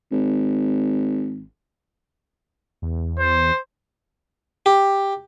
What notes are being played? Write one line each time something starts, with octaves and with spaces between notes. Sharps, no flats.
G#1
E2
C5
G4